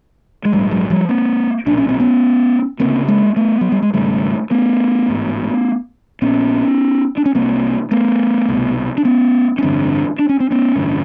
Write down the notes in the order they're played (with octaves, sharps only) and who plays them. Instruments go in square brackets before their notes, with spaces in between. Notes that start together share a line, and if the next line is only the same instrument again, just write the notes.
[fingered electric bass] G#3
A#1 G#2 G3 A3
F#3 G#3
F3 G3
A#3 C4
B1 A#2 D4
C#4
C4
B3 C#4
D2 C#3 A#3 C4
G#3 A#3
A3 B3
F#3
G3
G#3
G#1 F#2 C#3 G3 A3
A3 B3
A1 G#2
A#1 A#2 B3 C#4
D4
C#4
C2 C3 A#3 C4
A3 B3
C2 B2
D4
B3 C#4
C#4
A1 G2 D3 C4 D4
D4
C#4
C4
B3 C#4
A1 G2 D3